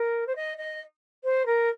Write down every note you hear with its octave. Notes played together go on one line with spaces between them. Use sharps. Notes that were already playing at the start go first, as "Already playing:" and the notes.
Already playing: A#4
C5
D#5
D#5
C5
A#4